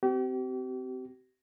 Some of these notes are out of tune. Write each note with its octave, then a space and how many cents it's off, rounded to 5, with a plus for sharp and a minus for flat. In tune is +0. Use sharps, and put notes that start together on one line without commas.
C4 -20 G4 -40